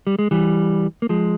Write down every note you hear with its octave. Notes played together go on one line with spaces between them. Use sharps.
G3
G#3
E3 G3
A#3
F3 G#3